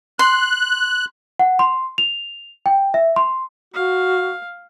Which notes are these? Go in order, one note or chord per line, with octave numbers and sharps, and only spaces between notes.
C6 F#6
F#5
C6
F7
G5
E5
C6
F#4 F5